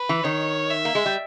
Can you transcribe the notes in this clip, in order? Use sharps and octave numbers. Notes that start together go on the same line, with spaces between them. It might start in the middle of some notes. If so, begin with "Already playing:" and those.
Already playing: B4
E3
D#3 C#5
E5
A#3
G#3
G3